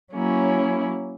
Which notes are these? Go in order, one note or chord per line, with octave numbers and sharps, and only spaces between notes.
F#3 A#3 C#4 E4